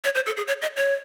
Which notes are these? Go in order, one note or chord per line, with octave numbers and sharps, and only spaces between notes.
C#5
C5
A4
G#4
C#5
D#5
C#5